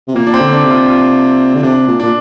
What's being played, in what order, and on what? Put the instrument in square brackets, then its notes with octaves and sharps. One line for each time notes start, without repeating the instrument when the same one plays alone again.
[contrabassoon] C3
[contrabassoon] A#2 [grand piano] A#3
[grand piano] D4
C4
[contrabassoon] D3
[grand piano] D4
[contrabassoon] C3
[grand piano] F4
F4
[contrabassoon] D3
[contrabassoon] C3 [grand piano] D4
[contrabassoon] A#2
[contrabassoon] A#2 [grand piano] D4